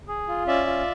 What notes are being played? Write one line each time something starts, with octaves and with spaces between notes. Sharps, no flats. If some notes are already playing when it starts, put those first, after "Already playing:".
G#4
F4
C#4 D5 E5
F4